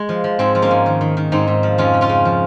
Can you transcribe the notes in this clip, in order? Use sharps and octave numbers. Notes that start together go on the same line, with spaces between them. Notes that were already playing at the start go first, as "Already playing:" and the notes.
Already playing: G#3
F3
F3
G#2 G#3 C4
F3
A#3 C#4
G#2
D#3
D#3
D#3
G#2 C4 D#4
G#2
F3
F2 C#4 F4
C#3
C#4 F4
C#3
F3